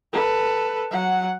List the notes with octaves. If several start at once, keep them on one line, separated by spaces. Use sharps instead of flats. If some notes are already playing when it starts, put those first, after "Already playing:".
A4 B4
F#3 F#5